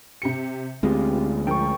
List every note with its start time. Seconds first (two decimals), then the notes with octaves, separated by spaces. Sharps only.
0.22 C3 G4 C#7
0.83 D2 G#3 B3 C4 F4 G4
1.47 F3 A#4 G5 C#6